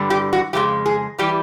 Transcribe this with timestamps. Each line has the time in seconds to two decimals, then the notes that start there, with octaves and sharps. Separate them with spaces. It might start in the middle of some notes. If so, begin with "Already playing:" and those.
Already playing: G2 D3 G3
0.10 G4
0.33 F#4
0.53 F2 C#3 G#3 G4
0.86 G#4
1.18 E3 G3 G4